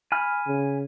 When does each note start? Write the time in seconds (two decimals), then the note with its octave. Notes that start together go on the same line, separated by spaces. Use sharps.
0.12 G#5 B5 F6
0.48 C#3